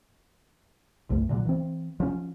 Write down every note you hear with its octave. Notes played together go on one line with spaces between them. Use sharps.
C2 G2 A3
A#2 D3 E3 F#3
E3 C4
F3 C#4